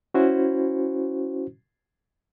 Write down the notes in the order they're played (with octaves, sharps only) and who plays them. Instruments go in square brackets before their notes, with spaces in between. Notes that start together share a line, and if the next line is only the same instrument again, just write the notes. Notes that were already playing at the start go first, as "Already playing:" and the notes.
[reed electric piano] C#4 E4 F#4 C5